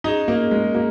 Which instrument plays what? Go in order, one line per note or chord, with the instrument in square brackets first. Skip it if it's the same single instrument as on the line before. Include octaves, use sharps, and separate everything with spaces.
[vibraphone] C#4 G#4 D#5 [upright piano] D#4
[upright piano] A#3
G#3
A#3